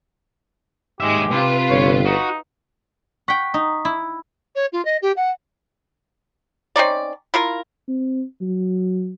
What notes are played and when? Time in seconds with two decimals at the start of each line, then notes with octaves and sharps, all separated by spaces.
1.00 D#2 G#2 G#3 G4 E5
1.31 C3 F4 B4
1.70 G1 C#5
2.05 D#4 F#4
3.28 F#5 G5 C#6 B6
3.54 D#4
3.85 E4
4.55 C#5
4.72 F4
4.85 D#5
5.02 G4
5.16 F#5
6.76 C4 C#4 D#4 D5
7.34 E4 F4 A#4
7.88 C4
8.41 F#3